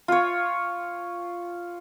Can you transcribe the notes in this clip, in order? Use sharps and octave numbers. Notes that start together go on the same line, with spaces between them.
F4 C#5